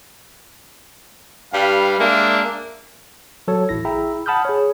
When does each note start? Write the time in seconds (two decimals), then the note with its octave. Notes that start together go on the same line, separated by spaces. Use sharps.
1.54 G2 G3 B4 F5
1.99 G#3 A#3 D4 E5
3.48 F#3 A4 C#5
3.69 A1 E4 A#6
3.85 E4 G#4 E5 G5 A#5
4.26 F#5 A5 B5 D#6 F6 G6
4.45 G#4 C#5